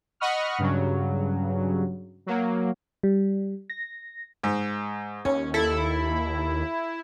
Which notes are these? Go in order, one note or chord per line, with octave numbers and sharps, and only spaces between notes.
D#5 F#5 B5 C#6 D#6 F6
G2 C#3 F#3
F#3 A#3
G3
A#6
G#2
D#2 C#4
E4 A4